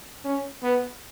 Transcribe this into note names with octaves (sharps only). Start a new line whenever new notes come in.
C#4
B3